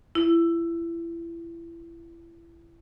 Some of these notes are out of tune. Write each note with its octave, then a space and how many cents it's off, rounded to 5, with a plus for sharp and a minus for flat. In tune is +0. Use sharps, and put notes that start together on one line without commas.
E4 +30